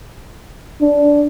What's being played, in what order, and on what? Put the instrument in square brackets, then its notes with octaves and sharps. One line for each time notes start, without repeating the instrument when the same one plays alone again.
[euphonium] D4